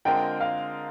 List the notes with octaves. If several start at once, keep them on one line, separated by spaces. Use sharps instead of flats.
D3 G#3 C4 F4 A#4 G5
F5